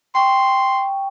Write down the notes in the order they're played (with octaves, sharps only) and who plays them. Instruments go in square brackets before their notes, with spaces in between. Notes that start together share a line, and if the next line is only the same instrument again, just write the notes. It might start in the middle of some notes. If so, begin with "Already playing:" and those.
[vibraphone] G5 C#6 [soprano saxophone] C6